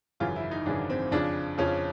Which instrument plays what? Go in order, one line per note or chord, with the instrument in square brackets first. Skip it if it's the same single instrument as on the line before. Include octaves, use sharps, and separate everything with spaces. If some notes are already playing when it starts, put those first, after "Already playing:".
[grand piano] G#1 F#2 C#3 E3 F4
E4
D#4
G#1 F#2 C#3 E3 D4
C4
F2 C#3 F3 D4
F2 C#3 F3 C#4